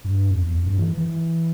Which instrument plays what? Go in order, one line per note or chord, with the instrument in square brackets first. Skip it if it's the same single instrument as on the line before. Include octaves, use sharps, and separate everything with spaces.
[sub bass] G2
F2
E2
F2
G2
E3
E3